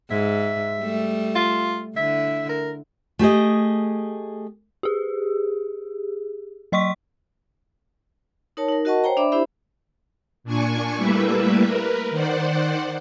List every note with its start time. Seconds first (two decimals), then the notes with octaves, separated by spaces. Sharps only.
0.10 G#2 E5
0.79 G3 A3
1.35 F4
1.96 D3 E4 E5
2.49 A#4
3.19 A3 G4 G#4 D#5
4.83 G4 G#4
6.72 F#3 D#5 C6 C#6 B6
8.57 D#4 A#4 C#5 A5
8.69 D#4 A#4
8.85 F#4 A#4 D#5 F#5 A5 C#6
9.04 C5 C#5 G5 A#5
9.17 D4 D5 E5 B5 D6
9.32 D4 E4 G4 C5 E5 B5
10.44 A#2 D4 G#5 C#6
10.97 G3 A3 A#3 E4 B4 E5
11.62 A#4 B4
12.10 D#3 C5 D5 F#5